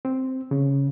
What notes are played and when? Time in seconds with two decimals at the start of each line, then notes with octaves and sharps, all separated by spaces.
0.05 C4
0.51 C#3